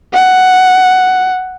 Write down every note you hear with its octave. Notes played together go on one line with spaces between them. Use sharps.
F#5